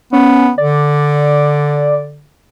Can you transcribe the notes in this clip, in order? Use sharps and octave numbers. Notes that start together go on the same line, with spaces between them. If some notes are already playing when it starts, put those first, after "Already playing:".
B3 C#4
D3 D5